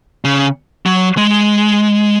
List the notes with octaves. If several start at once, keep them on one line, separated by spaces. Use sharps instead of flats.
C#3
F#3
G#3